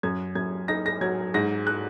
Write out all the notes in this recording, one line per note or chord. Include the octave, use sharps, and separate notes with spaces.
F#2 G#6
F#2 G#6
D#4 A#6
A#6
F#3 G#6
G#2 A#6
F#6